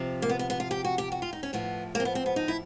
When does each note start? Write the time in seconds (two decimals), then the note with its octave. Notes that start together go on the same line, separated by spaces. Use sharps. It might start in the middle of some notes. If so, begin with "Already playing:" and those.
Already playing: C3 F3
0.22 A#3
0.29 B3
0.39 B3
0.50 B3
0.60 F4
0.71 G4
0.84 F#4
0.98 G4
1.12 F#4
1.22 F4
1.33 D#4
1.43 C#4
1.53 A2 F3 B3
1.95 A#3
2.00 C4
2.05 B3
2.15 C4
2.26 B3
2.36 D#4
2.48 E4